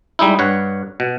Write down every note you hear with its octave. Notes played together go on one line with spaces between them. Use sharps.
G3 G#3 D#4 E4
G2 C#5 F#5
B2